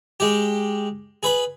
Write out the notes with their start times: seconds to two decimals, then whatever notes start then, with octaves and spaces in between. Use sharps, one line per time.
0.20 G#3 G4
1.23 G#4 B4 B5